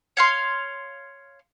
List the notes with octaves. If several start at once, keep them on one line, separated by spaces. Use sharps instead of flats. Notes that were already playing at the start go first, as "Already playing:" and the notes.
C#5 F5 C6